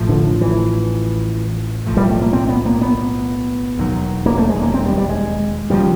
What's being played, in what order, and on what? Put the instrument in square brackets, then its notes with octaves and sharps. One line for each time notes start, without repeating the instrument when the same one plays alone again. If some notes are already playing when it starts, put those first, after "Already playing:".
Already playing: [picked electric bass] A1 A2 F3
[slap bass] D3
E3
[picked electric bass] B1 A2 F3
[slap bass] G3
A3
A#3
C4
B3
A#3
B3
[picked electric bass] E1 D#2 D#3 F#3
[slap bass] A#3
A3
G#3
A#3
C4
G3
G3
G#3
[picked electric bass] D#2 C#3 F3 [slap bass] G3